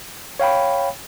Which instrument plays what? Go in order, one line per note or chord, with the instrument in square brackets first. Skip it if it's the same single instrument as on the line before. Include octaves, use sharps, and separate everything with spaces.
[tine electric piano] C#5 F5 G5 B5